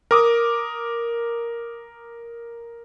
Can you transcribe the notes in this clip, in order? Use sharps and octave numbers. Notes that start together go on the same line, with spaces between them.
A#4 D6 D#6